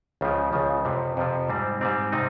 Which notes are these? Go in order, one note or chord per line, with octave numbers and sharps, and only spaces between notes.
C#2 C#3 F3
C#2 C#3 F3
F2 C3 F3
F2 C3 F3
G#2 G3 C4
G#2 G3 C4
C3 G3 C4 D#4